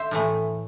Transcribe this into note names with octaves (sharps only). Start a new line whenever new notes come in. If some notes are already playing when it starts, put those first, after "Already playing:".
Already playing: C5 E5
A2 E3 A3